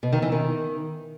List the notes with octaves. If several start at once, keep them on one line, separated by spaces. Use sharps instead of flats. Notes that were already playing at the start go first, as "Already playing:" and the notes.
B2
D#3
E3
D#3